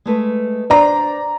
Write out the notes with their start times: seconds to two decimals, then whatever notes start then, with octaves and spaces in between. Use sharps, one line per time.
0.06 G#3 A3 B4
0.70 D4 C5 D5 A#5